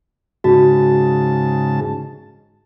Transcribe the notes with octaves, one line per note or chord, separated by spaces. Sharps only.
G#2 C#3 F#4 A5